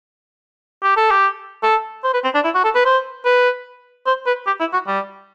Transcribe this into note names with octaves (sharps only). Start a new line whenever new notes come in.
G4
A4
G4
A4
C5
B4
C4
D4
E4
F#4
A4
B4
C5
B4
C5
B4
G4
E4
F#4
G3